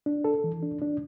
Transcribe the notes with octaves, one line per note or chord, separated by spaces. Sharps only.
D4
A4
E3
D4
D4